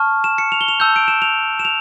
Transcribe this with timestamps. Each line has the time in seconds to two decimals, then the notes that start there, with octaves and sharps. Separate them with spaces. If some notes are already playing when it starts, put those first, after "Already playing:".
Already playing: A5 C#6 F6
0.24 E7
0.38 C#7
0.52 F7
0.61 G7
0.68 F7
0.80 A5 E6 G6
0.96 D7
1.08 E7
1.22 F7
1.59 E7
1.65 F7